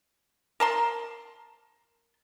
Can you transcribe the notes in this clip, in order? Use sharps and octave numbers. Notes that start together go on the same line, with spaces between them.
A#4 A5 C6